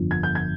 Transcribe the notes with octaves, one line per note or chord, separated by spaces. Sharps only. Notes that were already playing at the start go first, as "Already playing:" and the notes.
Already playing: G1 F2 D3 F3
G#6
G6
G#6